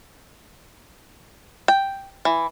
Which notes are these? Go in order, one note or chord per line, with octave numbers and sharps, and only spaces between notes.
G5
E3